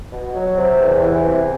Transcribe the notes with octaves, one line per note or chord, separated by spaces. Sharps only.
B2
F#3
C3
E2
E3
C3